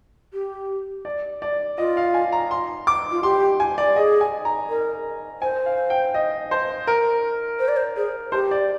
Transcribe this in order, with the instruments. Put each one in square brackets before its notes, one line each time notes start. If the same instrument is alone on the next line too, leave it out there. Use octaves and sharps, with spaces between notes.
[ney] G4
[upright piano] D5
D5
[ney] F4 [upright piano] D#5
[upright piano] F5
G#5
A#5
C6
D6
[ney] F4
[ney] G4 [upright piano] C6
[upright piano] G#5
D5
[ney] G#4 [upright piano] D#5
[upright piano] G#5
A#5
[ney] A#4
[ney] C5 [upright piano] G#5
[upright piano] F5
G5
D#5
C5
A#4
[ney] C5
D5
C5
G#4
[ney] G4 [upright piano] C5
[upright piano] D5